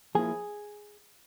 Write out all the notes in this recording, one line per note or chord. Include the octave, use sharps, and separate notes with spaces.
F3 A#3 E4 G#4